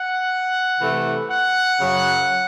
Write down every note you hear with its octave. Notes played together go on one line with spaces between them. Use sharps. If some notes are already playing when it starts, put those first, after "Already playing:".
Already playing: F#5
C3 E3 A3
F#5
F#2 C#3 F#3